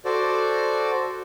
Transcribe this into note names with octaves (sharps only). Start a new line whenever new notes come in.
F#4 A4 C5 D5